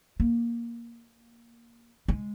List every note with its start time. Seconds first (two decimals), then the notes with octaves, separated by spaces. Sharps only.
0.20 A#3
2.08 G#3